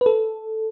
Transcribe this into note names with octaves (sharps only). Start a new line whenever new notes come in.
B4
A4